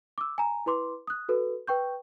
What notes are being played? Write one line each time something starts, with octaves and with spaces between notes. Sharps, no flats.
D6 E6
G#5 A#5
E4 B4 C6 D6
D#6 F#6
F#4 A4 B4
B4 G5 C#6 G6